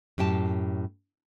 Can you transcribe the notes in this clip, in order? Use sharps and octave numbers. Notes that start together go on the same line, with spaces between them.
F#2 A2 G4 G5 A5